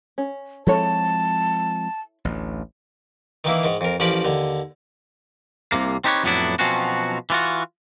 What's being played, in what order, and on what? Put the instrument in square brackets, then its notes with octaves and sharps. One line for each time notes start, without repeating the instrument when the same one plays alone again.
[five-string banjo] C#4
[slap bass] F3 G#3 C4 [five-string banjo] E4 A4 C#5 [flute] A5
[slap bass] A1 D2
[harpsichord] D#3 E3 A#3 E4
G#2 D#3
F2 A#4
A1 F3 C#4 A#4 D5 B5
D#2 D3
[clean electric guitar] C2 C3 A#3
C4 D#4 G4 G#4 B4 C#5
F2 A2 F#3 B3 D4 E4
B2 F3 F#3 C4 C#4 F#4
E3 F4 F#4